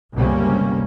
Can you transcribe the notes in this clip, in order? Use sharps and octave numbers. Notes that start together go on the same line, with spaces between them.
G1 C#2 C3 G3 A#3 C#4